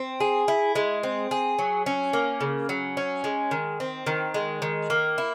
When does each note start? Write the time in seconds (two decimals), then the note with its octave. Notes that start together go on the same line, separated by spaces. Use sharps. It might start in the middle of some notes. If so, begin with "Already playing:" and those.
Already playing: C4
0.20 G#4
0.48 E4
0.75 G#3
1.03 C4
1.31 G#4
1.59 F#3
1.86 C#4
2.13 A#3
2.41 C#3
2.69 F#3
2.97 C#4
3.24 G#3
3.51 D#3
3.80 C4
4.07 D#3
4.34 G#3
4.62 D#3
4.90 A#3
5.18 E4